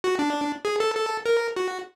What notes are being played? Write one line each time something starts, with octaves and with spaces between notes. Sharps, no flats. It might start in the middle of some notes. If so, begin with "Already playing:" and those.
F#4
D4
G#4
A4
A4
A#4
F#4